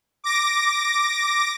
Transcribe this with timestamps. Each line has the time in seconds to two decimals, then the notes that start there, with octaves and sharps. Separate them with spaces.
0.24 D6 A#6